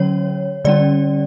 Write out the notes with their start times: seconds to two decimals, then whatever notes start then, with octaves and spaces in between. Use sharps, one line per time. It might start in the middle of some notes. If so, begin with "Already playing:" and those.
Already playing: D3 F#3 C#4 C#5
0.65 D3 G3 C#4 D5